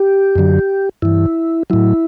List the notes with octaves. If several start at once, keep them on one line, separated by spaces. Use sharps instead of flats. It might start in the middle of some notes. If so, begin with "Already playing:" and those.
Already playing: G4
F#2 D3 F#3
G2 E3 E4
A2 F#3 E4